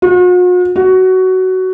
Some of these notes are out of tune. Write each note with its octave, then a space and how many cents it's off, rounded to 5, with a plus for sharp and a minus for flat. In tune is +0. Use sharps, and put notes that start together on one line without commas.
F#4 -45
F#4 +15